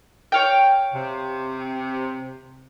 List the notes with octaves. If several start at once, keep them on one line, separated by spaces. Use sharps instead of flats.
C#5 F5 G5
C3